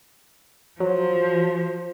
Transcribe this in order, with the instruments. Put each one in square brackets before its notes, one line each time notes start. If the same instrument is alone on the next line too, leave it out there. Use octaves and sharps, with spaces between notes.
[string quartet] F3 [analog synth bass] F#3